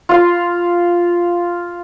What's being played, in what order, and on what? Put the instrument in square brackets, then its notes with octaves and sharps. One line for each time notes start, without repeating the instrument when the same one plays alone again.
[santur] F4 F5 C6